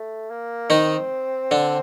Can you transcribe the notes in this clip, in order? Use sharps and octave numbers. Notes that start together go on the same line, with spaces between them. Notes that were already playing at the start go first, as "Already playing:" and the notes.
Already playing: A3
A#3
D#3 C4 D#4
D3 D4